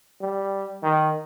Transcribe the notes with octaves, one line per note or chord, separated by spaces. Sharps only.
G3
D#3